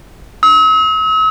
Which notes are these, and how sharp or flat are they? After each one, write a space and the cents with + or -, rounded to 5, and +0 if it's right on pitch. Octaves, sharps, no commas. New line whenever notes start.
E6 -45